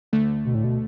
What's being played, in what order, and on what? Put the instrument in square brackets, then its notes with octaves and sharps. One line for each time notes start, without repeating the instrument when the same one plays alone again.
[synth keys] D2 D3 A3
[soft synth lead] B2
A2
B2